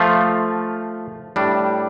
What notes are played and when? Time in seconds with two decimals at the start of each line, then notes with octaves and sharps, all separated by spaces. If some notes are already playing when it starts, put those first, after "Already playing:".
Already playing: F3 A3 F4
1.36 A2 G3 D4